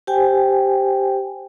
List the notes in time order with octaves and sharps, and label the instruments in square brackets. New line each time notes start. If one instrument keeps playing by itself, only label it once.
[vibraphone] G4 C5 G5 G#5